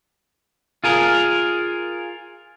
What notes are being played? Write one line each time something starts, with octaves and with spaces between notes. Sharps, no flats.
F4 G#4 A#4